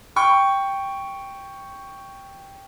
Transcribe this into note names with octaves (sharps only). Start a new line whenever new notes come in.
G5 C#6